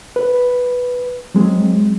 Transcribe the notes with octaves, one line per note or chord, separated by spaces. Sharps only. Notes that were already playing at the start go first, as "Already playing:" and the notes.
B4
F#3 G#3 C4